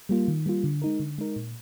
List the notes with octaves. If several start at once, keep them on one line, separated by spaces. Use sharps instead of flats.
G3 A#3 F4
D#3
G3 A#3 F4
D3
G#3 D#4 A#4
D3
G#3 D#4 A#4
A#2